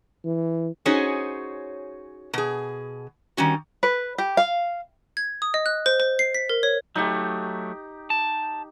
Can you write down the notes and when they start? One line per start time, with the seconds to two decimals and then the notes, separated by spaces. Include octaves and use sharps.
0.25 E3
0.85 C#4 D#4 F#4 G#4 C5 C#5
2.33 B2 G#4
3.37 D#3 G3 C#4 F#4
3.83 B4
4.18 G4
4.37 F5
5.17 G#6
5.42 D#6
5.54 D#5
5.66 F#6
5.86 C5
6.00 C5
6.19 C7
6.35 B6
6.49 A#4
6.63 C#5
6.95 F#3 A3 D#4 G4
8.10 A5